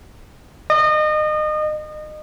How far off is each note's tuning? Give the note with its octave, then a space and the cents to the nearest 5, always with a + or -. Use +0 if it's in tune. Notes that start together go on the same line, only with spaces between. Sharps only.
D#5 -30